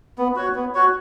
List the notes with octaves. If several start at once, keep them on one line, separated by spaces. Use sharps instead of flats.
B3
F#4 C#5
B3
F#4 C#5